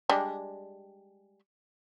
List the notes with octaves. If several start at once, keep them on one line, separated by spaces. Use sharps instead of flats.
G3 G#3 D4